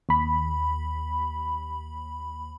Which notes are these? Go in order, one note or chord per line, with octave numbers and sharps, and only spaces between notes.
D#2 B5